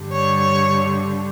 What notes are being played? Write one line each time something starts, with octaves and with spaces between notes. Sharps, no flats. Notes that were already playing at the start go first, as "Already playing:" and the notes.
Already playing: G2 D3 G3
C#5
C#5